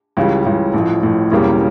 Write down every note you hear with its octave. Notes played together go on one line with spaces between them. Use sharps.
C#2 C#3 E3 G3
C#2 C#3 E3 G3
A1 A2 F3
A1 A2 F3
E1 E2 C#3 G3 A#3